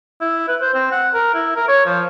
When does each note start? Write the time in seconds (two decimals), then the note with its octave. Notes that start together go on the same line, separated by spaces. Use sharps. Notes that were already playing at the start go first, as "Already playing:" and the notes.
0.21 E4
0.48 B4
0.61 C5
0.74 C4
0.92 F#5
1.14 A#4
1.34 E4
1.56 A#4
1.68 C#5
1.86 F3